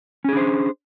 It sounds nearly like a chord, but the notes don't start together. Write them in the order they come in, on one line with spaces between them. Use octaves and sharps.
C#4 G#4 D4 C5